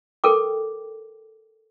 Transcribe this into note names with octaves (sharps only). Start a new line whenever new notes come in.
A4 A#4 G5 D6